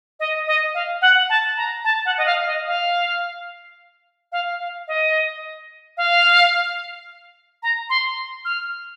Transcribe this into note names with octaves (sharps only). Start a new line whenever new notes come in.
D#5
D#5
F5
F#5
A5
A#5
A5
F#5
D#5
F5
D#5
F5
F5
F5
D#5
F5
A#5
C6
F6